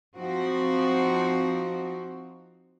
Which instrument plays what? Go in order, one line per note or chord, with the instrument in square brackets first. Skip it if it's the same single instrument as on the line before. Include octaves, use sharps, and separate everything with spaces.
[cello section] F3 C4 D#4 F#4